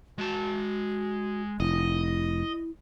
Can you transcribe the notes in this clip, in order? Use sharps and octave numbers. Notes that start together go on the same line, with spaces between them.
G#3 F#4 A5
F1 E4 D#5